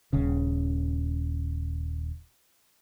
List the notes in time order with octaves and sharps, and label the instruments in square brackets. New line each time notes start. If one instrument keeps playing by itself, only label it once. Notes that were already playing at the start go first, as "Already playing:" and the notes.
[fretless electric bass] D#1 C#3